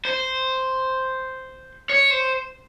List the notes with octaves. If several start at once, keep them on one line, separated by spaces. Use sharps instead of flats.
C5
C#5
C5